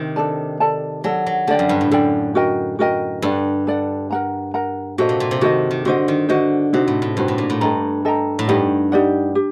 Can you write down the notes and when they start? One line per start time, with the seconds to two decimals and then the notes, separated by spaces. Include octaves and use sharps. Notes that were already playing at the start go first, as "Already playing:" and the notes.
Already playing: C3 D#3
0.16 D4 A4 D5 A5
0.60 A4 D5 A5
1.04 F#3 A4 D5 A5
1.26 F#3
1.47 D3 A4 D5 G5
1.59 F#2
1.69 G2
1.81 A2
1.91 F#2 A4 D5 G5
2.35 F#4 A#4 D#5 G5
2.79 F#4 A#4 D#5 G5
3.22 G2 A4 D5 F#5
3.67 A4 D5 F#5
4.11 A#4 F#5 A#5
4.54 A#4 F#5 A#5
4.98 A#2 F#4 A4 C5 D#5
5.09 C3
5.20 A#2
5.31 C3
5.41 D#3 F#4 A4 C5 D#5
5.71 D#3
5.85 D3 F#4 C5 D#5
6.08 D#3
6.29 D3 F#4 C5 D#5
6.73 C3 D#4 F#4 C5
6.88 A2
7.02 A2
7.17 G2 D#4 F#4 C5
7.28 A2
7.38 A#2
7.50 A2
7.61 G2 A4 D#5 G5 A#5
8.05 A4 D#5 G5 A#5
8.39 A2
8.48 G2 D#4 G4 D5 F#5
8.92 D#4 G4 D5 F#5
9.35 G4